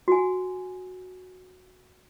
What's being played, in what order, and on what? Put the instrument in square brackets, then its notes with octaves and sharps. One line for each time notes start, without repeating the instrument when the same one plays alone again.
[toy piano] F#4 G#5